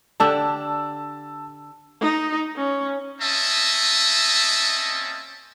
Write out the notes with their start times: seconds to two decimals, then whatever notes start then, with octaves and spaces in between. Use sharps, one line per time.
0.20 D3 D4 G4 A5 E6
2.02 D#4
2.57 C#4
3.21 A#3 C4 C#4 D#5 E5 A5